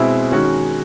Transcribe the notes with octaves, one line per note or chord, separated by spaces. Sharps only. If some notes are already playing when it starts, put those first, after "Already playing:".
Already playing: B2 G#3 C4 E4
D#3 G#3 C#4 F#4